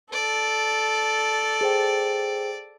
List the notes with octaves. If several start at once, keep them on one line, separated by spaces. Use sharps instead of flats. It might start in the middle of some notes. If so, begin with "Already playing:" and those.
A4 D5
G#4 C5 G5